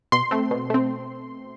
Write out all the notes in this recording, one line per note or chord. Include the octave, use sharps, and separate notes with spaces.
B2 C6
A3 C4
B2
A3 C4